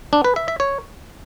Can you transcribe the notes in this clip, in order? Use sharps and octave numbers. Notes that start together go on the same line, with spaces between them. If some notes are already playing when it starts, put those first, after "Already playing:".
D4
B4
E5
E5
C#5